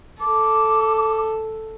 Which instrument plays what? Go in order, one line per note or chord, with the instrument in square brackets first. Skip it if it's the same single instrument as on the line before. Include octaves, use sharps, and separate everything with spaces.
[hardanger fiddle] A4 [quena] D6